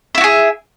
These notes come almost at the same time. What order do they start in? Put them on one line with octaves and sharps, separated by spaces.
E5 E4 F#4 G#4